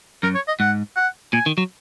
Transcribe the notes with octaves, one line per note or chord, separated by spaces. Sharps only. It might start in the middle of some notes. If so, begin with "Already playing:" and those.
F#2 A#4
C#5
D#5
G#2 F#5
F#5
A#2 G#5
D#3
F#3